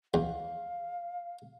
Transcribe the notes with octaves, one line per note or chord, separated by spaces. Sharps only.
E2 F5